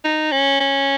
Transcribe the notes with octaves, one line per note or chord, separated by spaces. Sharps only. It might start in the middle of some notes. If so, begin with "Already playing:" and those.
D#4
C#4
C#4